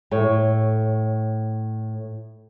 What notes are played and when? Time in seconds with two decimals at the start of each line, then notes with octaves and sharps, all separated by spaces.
0.11 A2 C#5